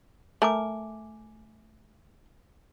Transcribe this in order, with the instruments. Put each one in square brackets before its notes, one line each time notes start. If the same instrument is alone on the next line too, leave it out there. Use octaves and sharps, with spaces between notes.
[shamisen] A3 A#4 [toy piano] G#5 D6